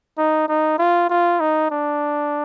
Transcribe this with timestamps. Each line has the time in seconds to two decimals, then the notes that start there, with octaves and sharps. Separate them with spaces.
0.18 D#4
0.48 D#4
0.79 F4
1.10 F4
1.40 D#4
1.71 D4